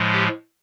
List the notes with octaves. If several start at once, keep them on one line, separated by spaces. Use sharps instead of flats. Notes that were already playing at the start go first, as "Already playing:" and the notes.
Already playing: A2 F3 G#3
G4